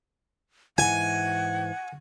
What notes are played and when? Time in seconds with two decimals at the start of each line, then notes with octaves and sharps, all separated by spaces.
0.78 G#2 E3 F#5 G#5